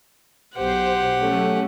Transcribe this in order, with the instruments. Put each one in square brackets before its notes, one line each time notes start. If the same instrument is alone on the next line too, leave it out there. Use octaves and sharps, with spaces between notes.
[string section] B1 C5 [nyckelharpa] G4 F#5
[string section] F#3 A3 C#4